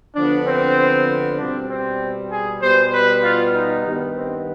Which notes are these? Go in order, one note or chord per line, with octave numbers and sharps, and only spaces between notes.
D3 F3 B3 D4
C4
B2 G3 C4 D4
C4
G#4
B2 G3 B3 C5
B4
F4
D#4
G2 D#3 B3
C4